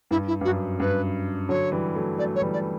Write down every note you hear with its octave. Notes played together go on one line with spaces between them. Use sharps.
G2 E4
E4
G2
F#2 F#4
G2 B4
D3 F#3 C#5
E3 G3
F#3 A3
F#3 A3 D5
C#5
E3 G3
D5